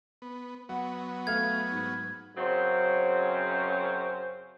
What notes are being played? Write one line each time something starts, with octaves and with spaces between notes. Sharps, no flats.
B3
F#3 B3 F#5
A3 F5 F6 G#6
G#2
F#2 C#3 F#3 C4 C#4 C5